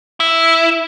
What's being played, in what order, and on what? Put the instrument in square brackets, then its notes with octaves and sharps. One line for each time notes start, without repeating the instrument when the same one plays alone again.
[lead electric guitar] E4